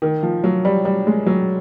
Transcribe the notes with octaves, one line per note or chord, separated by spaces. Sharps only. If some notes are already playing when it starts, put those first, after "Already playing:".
D#3
F3
F#3
G3
G3
G#3
F#3